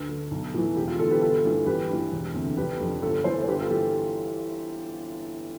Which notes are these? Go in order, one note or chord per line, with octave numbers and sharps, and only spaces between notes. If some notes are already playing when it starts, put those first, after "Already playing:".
Already playing: D2 B4
D3
B1
A2 E3
E1 G4
F4
E2 D3 F4 A4
G4 B4
G1 F4 A4
G2 E3
A1 G4 B4
G2 E3
E1
D2 C3
F1 G4 B4
F2 D3
G1 F4 A4
G2 E3 A4 C5
C5
G1 G4 B4
F4 A4
E3 G4